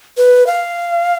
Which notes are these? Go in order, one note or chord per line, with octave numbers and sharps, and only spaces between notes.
B4
F5